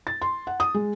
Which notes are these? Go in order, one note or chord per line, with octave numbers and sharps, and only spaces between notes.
A6
C6
F#5
D#6
G#3